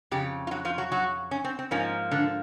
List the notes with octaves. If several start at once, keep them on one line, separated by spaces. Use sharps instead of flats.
F2 C#3 G4
F4
F#3 F#4
F3 F4
F#3 F#4
F#3 F#4
C#4
C4
C4
G#2 F3 A#3 C#4
D3 D4